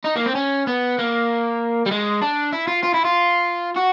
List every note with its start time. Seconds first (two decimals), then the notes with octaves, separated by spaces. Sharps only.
0.04 D#4
0.16 A#3
0.26 C4
0.35 C#4
0.67 B3
0.98 A#3
1.86 G3
1.91 G#3
2.21 D4
2.53 E4
2.68 F4
2.83 F4
2.94 E4
3.05 F4
3.76 F#4